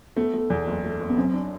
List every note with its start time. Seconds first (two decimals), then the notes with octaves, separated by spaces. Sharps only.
0.17 A3 B3
0.34 A3
0.50 E2
0.67 F#1
0.84 A3
1.00 F#1
1.09 B3
1.17 F#2 C4
1.34 D4